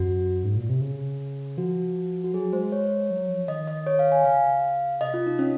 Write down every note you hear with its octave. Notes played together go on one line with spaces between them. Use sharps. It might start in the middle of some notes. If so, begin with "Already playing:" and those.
Already playing: F#2 F#4
G#2
A#2
C3
C#3
F3 F#4
F#4
F#3 G#4
G#3 C5
C#5
F#3
F3
D#3 D#5
D#5
C#5
F5
G#5
C#3 F5
C3 D#5
F4
D#4
C#4